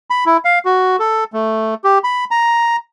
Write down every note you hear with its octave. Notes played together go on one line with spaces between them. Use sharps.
B5
E4
F5
F#4
A4
A3
G4
B5
A#5